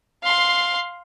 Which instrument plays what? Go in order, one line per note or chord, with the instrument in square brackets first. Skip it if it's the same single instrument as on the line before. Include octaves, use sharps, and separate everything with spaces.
[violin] F5 C6